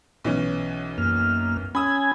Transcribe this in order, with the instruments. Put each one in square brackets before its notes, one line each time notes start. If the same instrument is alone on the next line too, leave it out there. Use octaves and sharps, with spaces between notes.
[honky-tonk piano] B1 E3 C#4
[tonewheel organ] F#2 A#3 F6
[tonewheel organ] C#4 G#5 G#6 [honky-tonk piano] B5 D#6 E6